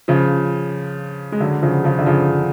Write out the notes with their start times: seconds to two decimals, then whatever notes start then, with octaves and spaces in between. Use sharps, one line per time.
0.08 C#3 F3
1.32 G#3
1.40 D3 F#3
1.62 C#3 F3
1.84 C#3 F3
1.99 D3
2.06 C#3 F3